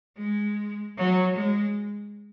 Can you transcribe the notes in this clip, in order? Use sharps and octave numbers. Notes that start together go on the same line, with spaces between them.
G#3
F#3
G#3